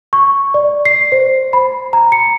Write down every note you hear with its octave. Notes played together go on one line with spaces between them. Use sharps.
C#6
D5
C7
C5
B5
A#5
C#7